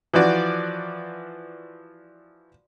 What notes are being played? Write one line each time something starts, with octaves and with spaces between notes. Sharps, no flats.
E3 F3 F#4 D5